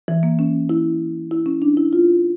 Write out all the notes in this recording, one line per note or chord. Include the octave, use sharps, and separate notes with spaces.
E3
A#3
C#4
E4
E4
C#4
D4
E4
F4